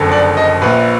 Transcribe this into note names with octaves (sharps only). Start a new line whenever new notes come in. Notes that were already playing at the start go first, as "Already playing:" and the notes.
Already playing: F#1 F2 D3
D5
D#5
A#1 A#2 B4